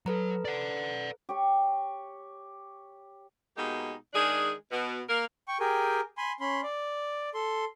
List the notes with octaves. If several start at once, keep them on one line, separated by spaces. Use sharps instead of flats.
F#3 A4 B4 A#5
D5 F#5
G4 C#5
B2 G#3 A#3 D#4 G4
D#3 G#3 D4 G#4
B2
A#3 A#4
G5 C#6
G4 G#4 A#4 G5 G#5
G#5 B5 C6
C#4 B5 C6
D5
A4 C6